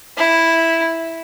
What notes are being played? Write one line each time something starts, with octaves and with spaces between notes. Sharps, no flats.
E4